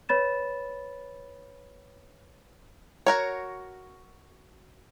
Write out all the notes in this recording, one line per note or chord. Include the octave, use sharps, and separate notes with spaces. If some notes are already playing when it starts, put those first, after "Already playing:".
B4 C#5 B5 A6 E7
F#4 A#4 C#5